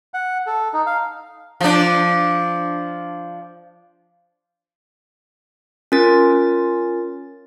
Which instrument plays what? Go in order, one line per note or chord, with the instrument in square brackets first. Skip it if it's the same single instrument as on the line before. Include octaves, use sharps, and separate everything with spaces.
[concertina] F#5
A4
D#4
F5
[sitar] F3 D4
[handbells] C#4 F4 A#4 A6